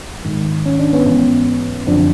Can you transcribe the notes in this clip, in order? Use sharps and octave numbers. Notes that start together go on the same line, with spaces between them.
G#2 D#3
C#4
D4
B3 C#4
G#2 E3
F#2 D3 F3 C4 D4